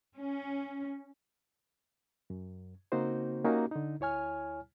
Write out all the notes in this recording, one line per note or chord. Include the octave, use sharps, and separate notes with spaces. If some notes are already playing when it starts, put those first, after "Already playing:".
C#4
F#2
C#3 A#3 C4 D#4 F#4 C5
A#3 C#4 D#4 F#4 G4
D3 D#4
D2 E4 C#5 G#5 F6